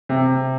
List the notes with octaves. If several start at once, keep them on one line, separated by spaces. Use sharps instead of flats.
C3